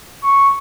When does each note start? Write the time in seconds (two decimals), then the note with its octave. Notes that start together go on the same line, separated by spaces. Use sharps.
0.24 C#6